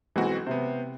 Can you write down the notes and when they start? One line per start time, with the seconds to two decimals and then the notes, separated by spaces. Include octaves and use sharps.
0.16 B1 E3 G#3 C4 F#4
0.47 C3 B3 C5